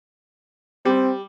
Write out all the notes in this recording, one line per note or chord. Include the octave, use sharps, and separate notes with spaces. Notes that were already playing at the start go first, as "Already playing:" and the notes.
G3 C4